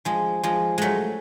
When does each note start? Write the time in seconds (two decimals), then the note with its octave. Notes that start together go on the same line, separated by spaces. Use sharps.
0.05 F3 G#3
0.43 F3 G#3
0.78 F#3 G#3 A3